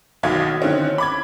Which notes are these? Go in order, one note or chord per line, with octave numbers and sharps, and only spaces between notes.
B1 B2 D#3 F5 G#6
D3 D#3 C4 C#4
B5 D6 G#6